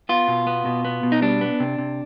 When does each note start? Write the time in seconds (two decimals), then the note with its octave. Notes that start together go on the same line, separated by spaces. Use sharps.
0.09 B3 F4
0.28 B2
0.47 B3
0.65 B2
0.85 B3
1.03 B2
1.12 D#4
1.22 G3 D4
1.41 B3
1.60 C3
1.78 C3